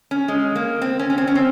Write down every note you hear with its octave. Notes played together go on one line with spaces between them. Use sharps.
C#4
G#3
A#3
C4
C#4
C#4
C4
C#4
C4